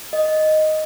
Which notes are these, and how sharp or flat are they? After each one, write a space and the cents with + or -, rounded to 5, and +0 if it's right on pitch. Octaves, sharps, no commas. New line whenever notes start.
D#5 +0